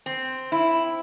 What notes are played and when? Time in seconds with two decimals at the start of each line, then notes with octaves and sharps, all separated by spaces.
0.06 C4
0.52 E4